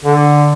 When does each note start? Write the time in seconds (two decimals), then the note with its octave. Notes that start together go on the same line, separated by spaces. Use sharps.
0.05 D3